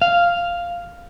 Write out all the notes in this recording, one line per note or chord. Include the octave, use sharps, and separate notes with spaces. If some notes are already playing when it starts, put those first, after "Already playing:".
F5